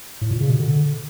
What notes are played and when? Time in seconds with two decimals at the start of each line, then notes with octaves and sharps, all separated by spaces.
0.21 A2
0.31 A#2
0.41 C#3
0.50 B2
0.60 D3